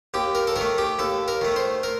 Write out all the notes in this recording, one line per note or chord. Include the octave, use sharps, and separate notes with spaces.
D#2 G4
A#4
A4
D#3 A#4
A3
G4
D#2 A4
A#4
D#3 A3
C5
A#4